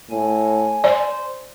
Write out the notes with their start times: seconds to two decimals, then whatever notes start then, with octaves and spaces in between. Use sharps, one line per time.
0.10 A2 G#5
0.84 C5 D5